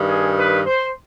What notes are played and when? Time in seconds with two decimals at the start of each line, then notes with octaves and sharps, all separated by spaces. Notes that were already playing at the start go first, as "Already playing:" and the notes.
Already playing: G2 D#3
0.08 G#4
0.38 B4
0.67 C5